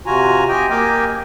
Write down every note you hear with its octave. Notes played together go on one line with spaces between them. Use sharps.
C3 F4 F#4 G#5 A#5
G4 D#5 G5 G#5
A#3 G4 D#5 F5 G5 G#5